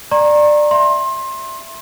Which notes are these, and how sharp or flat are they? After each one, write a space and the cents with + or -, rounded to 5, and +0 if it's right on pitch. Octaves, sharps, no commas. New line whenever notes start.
D5 +15 A#5 +0 C#6 -45
E5 +5 C6 +25